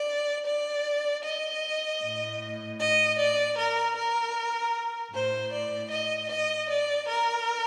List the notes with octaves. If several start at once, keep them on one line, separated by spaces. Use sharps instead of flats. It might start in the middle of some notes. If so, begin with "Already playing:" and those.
Already playing: D5
D5
D#5
A2
D#5
D5
A#4
A#4
A2 C5
D5
D#5
D#5
D5
A#4